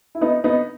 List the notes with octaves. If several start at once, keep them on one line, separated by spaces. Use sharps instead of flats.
E4
B3 D#4
B3 D#4